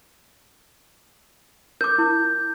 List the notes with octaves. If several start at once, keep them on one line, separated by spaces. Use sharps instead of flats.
A#4 D6 G6
E4